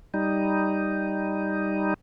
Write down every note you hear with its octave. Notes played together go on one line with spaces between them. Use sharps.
G3 D#4